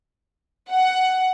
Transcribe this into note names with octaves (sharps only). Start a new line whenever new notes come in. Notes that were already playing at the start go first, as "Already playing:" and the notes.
F#5